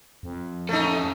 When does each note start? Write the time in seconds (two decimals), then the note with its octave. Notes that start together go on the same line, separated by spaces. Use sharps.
0.23 F2
0.69 A3 C#4 D#4 A4